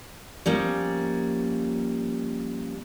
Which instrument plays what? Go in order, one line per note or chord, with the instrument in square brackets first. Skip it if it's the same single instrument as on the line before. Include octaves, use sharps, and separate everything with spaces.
[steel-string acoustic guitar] F3 G3 A#3 C#4